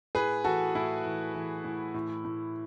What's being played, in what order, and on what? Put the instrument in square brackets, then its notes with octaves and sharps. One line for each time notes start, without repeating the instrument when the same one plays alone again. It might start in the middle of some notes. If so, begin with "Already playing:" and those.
[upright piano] A2 G#4 B4
E3 F#4 A4
A2 E4
E3
E3
A2
A2
A2